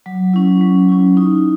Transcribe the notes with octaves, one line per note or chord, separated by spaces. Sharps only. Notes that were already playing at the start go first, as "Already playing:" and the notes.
F#3
C#4 E4
F#3
C#4 E4
D#4